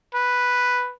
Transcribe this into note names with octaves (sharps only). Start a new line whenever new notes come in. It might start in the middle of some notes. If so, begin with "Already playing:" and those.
B4